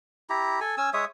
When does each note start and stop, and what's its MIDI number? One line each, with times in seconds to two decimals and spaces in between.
0.30 0.60 64
0.30 0.60 67
0.30 0.60 82
0.60 0.75 69
0.60 0.75 80
0.77 0.90 61
0.77 0.90 80
0.77 0.90 88
0.93 1.05 56
0.93 1.05 73
0.93 1.05 76
0.93 1.05 87